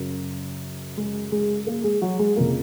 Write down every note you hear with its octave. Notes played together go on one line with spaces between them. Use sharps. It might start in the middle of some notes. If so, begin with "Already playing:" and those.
Already playing: F#2 C#3
G#3 G#4
G#3 G#4
A#3 A#4
G#3 G#4
F#3 F#4
G#3 G#4
F2 C#3 A#3 A#4